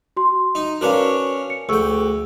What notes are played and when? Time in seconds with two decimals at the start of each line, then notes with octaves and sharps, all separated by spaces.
0.17 F#4 C6
0.55 D#4
0.81 C#4 D4 F#4 A#4 B4 F5
1.50 C#7
1.69 D2 G#4 G5 C#6 E6